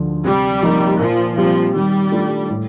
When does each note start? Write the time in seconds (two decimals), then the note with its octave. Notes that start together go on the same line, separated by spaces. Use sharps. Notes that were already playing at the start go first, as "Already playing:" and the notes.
Already playing: D2 D3 F3
0.24 C3 G3
0.63 F3 A#3 D#4
0.99 A#2 F3
1.38 F3 G3 C4 G4
1.75 D#3 G3
2.12 A3 D4 F4
2.50 A2